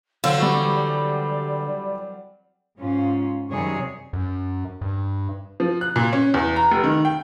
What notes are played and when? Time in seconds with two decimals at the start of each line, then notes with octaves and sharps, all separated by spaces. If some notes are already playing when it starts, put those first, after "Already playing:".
0.24 D3 F#3 C4 C5 F5 E6
0.39 E3 G3 C#6
0.76 D5
2.78 G#2 C#4 F4
3.50 F#2 C3 D#3 G3 G#4 C#5
4.13 F#2
4.81 G2
5.60 F3
5.81 F#6
5.96 A#2
6.13 C#4
6.34 E2
6.56 A#5
6.72 F1
6.83 D#3
7.05 G5